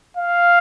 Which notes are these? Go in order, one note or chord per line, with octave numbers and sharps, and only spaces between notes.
F5